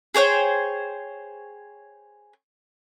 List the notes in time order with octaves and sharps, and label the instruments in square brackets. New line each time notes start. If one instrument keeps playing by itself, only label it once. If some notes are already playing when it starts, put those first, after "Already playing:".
[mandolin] G#4 C5 C#5 G5